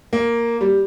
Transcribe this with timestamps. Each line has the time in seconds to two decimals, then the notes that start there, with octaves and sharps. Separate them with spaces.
0.13 A#3
0.61 G3